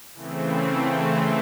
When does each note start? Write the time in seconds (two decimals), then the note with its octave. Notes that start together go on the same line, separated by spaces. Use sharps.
0.14 C#3 E3 A3 C4